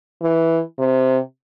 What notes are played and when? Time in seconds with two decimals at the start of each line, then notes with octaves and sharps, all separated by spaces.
0.22 E3
0.79 C3